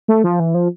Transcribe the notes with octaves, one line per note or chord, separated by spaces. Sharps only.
A3
F3
E3
F3